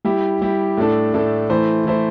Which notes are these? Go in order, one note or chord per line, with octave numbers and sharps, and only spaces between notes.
G3 E4 G4
G3 E4 G4
A2 A3 D4 A4
A2 A3 D4 A4
E3 A3 E4 C5
E3 A3 E4 C5